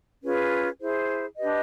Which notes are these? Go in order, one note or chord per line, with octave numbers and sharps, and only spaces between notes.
C#4 F4 G#4 B4
E4 G#4 C5
D4 G4 B4 D#5